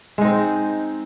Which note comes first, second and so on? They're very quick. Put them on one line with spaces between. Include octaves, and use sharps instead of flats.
G#3 D#4 C4